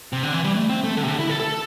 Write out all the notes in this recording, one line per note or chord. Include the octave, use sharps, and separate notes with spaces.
C3
D3
E3
G3
A3
C4
A3
D3
C3
D3
E4
A4
A4